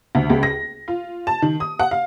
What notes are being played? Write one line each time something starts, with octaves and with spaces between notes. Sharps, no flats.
D2
C#2
A#6
F4
A5
D#3
D#6
F#5
F5